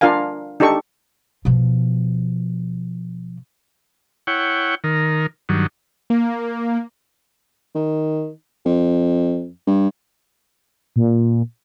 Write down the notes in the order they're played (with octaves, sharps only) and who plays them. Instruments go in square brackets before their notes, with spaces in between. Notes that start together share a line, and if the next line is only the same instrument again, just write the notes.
[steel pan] D4 F4 A#4 F5 G#5
D4 D#4 G4 A4 C#6
[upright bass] B2 F3
[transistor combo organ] E4 C#5 F#5 G5
D#3 A#4
G2 D#3 F#3
[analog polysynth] A#3
[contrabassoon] D#3
F2
G2
[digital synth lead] A#2